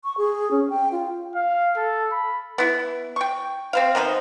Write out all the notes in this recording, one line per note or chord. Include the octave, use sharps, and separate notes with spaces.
C#6
G#4
C#4
G5
F4
F5
A4
B5
B3 E4
G5 C#6
C4 C5 F5
D#3 B3 G#4 C5